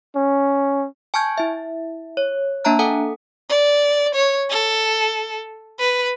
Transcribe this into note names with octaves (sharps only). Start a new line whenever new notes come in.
C#4
G#5 A5 C#6 F6 G6 G#6
E4 E5
C#5
A#3 D4 E5 A5 A#5 F#6
A4 F#5 G#5 D#6
D5
C#5
A4
B4